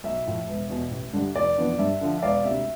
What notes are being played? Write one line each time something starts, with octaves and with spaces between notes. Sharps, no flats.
B1 E5
A2 F3
E1
E2 B2
A1
G2 D3 G3 D4
F1 D5
F2 E3 B3 D4
G2 E5
D3 F3
E5
E1 D5 F5
D2 C3 E5